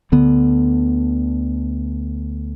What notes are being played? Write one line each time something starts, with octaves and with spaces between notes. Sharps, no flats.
D2 D3 B3